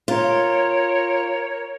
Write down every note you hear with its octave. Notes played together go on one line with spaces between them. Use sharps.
F4 A#4 C#5